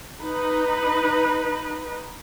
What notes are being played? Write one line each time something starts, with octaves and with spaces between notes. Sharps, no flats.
D#4 B4